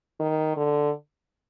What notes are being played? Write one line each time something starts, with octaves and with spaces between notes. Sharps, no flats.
D#3
D3